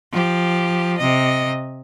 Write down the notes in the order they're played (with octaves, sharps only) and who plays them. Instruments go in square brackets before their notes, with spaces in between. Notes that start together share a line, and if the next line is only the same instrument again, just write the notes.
[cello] F3 G4
C3 D#5